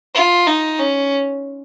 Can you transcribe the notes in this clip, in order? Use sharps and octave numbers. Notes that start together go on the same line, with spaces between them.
F4
D#4
C#4